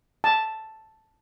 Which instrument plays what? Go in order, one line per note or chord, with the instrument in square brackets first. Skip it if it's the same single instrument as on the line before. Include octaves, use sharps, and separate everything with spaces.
[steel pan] A5